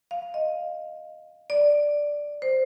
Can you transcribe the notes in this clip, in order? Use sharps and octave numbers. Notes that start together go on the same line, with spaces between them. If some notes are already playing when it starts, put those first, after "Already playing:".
F5
D#5
D5
C5